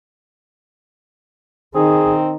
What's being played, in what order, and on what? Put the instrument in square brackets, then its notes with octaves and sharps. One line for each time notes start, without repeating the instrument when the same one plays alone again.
[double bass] D#3 D#4 [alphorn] C4 [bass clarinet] G#4